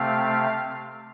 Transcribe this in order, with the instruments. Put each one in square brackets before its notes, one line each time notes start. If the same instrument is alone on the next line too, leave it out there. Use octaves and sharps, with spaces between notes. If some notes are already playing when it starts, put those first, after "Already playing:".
Already playing: [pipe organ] C3 A3 C4 F5